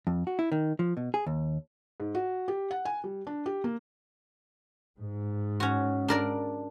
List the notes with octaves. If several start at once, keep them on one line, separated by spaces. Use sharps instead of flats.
F2
F#4
E4
D#3
F3
B2
G#4
D#2
G#2
F#4
G4
F#5
G#5
G3
D4
G4
A#3
G#2
C#4 F#4
D4 A#4 D5